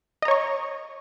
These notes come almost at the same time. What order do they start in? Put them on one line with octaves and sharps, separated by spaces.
D#5 A#5 C#5 C#6